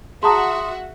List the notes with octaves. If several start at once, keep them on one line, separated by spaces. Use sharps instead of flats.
F#4 G#4 E5 F#5 A5 A#5 C6 D#6